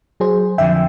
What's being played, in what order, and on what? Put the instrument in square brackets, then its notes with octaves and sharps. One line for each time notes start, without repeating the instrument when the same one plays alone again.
[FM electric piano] F#3 G#4 C5
[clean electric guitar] F2 D3 F3 [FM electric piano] E5 G5